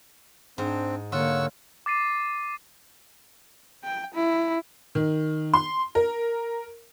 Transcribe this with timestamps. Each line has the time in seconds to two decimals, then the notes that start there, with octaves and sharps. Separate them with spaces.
0.58 G#2 C4 D4
1.12 D3 A#3 F4 C#5 F#5 C#6 E6
1.86 D6 A6 C7 D#7
3.84 G5
4.14 E4
4.95 D#3
5.54 C6
5.95 A#4